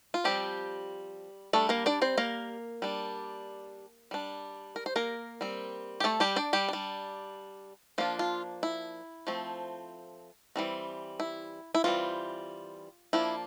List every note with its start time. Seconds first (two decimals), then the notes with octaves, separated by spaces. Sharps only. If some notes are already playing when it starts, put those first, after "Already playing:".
0.14 F4
0.24 F3 G3 C4 G4
1.53 G3 A3 D4 A4
1.69 A#3 A#4
1.86 D4 D5
2.02 C4 C5
2.18 A#3 A#4
2.82 G3 D4
4.11 G3 D4
4.76 A#4
4.86 C5
4.96 A#3 A#4
5.41 G3 C4
6.00 G4
6.04 A3 A4
6.20 G3 G4
6.36 D4 D5
6.53 G3 G4
6.69 G3 D4
7.98 F3 A#3 D4 F4
8.19 F4
8.63 E4
9.27 F3 A3 C4
10.56 E3 G3 C4
11.20 E4
11.75 E4
11.84 E3 G3 C4 F4
13.13 F3 A#3 D4 E4